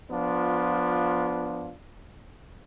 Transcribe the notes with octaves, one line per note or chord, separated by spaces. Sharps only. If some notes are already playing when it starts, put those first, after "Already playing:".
F3 B3 D4 F4